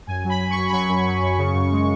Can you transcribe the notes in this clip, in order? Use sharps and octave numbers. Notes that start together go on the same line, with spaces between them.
F#2 G#5
F#3
B5
F#3
C#6
F#2
B5
F#3 C#6
F#2
F#3
F#2
C#3
F#2
G#3